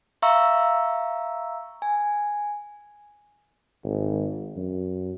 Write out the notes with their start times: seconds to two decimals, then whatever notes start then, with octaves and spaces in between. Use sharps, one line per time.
0.22 E5 F5 A#5 C#6 E6
1.82 G#5
3.84 G#1
4.56 F#2